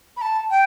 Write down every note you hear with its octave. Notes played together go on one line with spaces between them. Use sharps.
B5
A5
G5